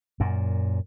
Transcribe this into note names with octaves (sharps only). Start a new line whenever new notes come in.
F#2 A#2